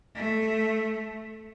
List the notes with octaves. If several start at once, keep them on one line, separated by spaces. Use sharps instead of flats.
A3